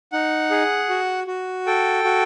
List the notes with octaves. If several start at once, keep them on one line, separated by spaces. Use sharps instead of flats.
D#4 F#5
G#4
F#4
F#4
A4 G5
F#4